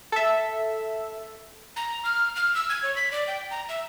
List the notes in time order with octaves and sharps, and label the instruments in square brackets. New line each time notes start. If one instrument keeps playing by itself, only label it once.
[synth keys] A4 E5
[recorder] A#5
F6
F6
E6
G#6
C#5
B6
D5
G5
A#5
E5